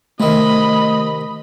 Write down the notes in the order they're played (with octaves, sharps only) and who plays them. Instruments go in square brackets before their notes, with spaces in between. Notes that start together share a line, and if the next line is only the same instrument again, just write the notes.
[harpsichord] C3 D#3 [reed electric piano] A3 [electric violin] D#5 B5